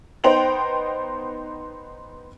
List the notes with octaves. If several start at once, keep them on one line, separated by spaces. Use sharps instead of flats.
B3 D#4 C5 G5 F7 F#7